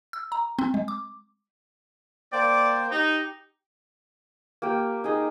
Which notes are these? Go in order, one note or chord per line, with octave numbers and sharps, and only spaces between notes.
E6
A#5
C4
G#3
D6
A#3 C5 D5 G5
D#4 G4
A#3 G4 G5
D#4 G#4 D#5